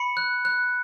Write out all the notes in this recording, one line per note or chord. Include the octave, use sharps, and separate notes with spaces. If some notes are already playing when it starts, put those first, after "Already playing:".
Already playing: B5 C#7
F#6
F#6